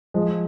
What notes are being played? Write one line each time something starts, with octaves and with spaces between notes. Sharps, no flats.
F3 G#3